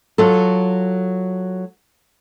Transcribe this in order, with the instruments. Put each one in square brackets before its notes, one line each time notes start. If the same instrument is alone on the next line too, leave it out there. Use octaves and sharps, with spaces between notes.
[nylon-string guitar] F#3 F4 A4